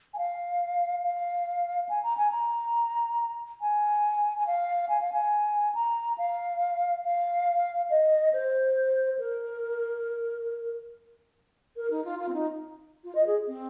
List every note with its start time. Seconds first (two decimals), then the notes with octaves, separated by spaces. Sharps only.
0.14 G#5
0.18 F5
1.03 F5
1.89 G#5
2.03 A#5
2.17 G#5
2.31 A#5
3.61 G#5
4.37 G#5
4.47 F5
4.89 G#5
5.01 F5
5.12 G#5
5.75 A#5
6.18 F5
7.05 F5
7.90 D#5
8.33 C5
9.19 A#4
11.76 A#4
11.91 D#4
12.04 F4
12.19 F4
12.28 C4
12.34 D#4
13.04 F4
13.15 D#5
13.26 G#4
13.47 C4